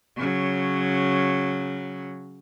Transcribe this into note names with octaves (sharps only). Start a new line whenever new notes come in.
C#3 F#3